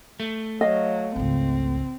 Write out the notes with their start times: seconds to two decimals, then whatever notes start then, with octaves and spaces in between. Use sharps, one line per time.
0.20 A3
0.61 F#3 D#5 F5
1.16 G#1 C#2 C4